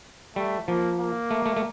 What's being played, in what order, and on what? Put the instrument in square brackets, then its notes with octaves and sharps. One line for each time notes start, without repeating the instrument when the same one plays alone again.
[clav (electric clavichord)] G3 [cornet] A3
[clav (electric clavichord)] F3 [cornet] A#3
[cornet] A#3
[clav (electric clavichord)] A3
A3
A3